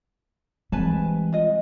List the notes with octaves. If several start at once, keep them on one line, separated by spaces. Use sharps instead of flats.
E3 G3 G#3 C4 B4 G#5 A5
F4 D#5